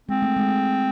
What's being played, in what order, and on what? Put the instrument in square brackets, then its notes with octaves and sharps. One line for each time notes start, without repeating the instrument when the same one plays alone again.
[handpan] G#3 [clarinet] C4
[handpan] A3
G#3